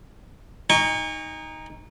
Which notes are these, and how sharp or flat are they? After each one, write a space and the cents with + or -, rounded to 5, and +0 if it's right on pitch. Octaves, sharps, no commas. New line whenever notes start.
D#4 +0 G#5 -40 C#6 +10